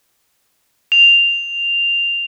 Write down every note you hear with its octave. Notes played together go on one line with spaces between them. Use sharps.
F7